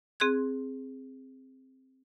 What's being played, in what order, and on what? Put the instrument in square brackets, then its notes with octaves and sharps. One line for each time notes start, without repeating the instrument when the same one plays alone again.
[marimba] C4 G#4 C6 F#6 G#6